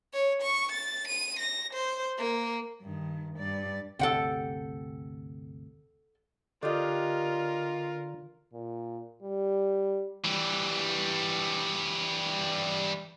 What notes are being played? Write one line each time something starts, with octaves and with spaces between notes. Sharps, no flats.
C#5
C#6
A6
D#7
A#6
C5
A#3
G2 D#3
G2 D5
G1 D2 C3 A4 F#5 G5
D3 D4 F4 G4 A#4 D#5
A#2
G3
E3 G3